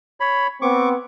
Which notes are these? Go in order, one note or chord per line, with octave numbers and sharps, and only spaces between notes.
C#5 B5
B3 C4 C#6 D6